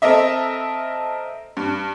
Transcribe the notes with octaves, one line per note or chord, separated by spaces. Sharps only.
C4 A4 A#4 D#5 E5
G2